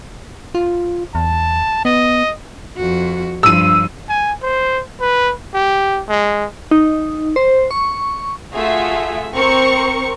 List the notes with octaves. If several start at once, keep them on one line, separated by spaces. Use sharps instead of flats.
F4
E2 A5
B3 D#5
F2 F#4
G2 F3 E6 D#7
G#5
C5
B4
G4
G#3
D#4
C5
C#6
A3 F4 F#4 G#4 E5
C4 A#4 C5 C#6 C#7